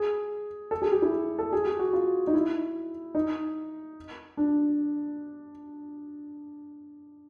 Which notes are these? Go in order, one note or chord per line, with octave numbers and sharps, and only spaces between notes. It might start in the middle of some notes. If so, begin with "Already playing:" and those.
Already playing: G#4
A4
G#4
G4
E4
A4
G#4
G4
F#4
F4
D#4
E4
D#4
D4